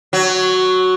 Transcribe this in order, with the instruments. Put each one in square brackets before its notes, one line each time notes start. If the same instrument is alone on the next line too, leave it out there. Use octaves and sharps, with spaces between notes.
[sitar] F#3